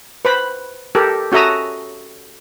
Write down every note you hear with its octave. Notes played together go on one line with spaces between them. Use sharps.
B4 C5 B5
G4 A4 A#4
C#4 F#4 A4 E5 A#5 D#6